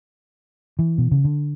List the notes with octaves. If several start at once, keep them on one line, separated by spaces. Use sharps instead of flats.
E3
B2
C#3
D3